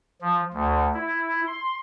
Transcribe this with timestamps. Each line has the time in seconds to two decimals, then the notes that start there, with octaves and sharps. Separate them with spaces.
0.21 F3
0.54 D2
0.94 E4
1.47 C6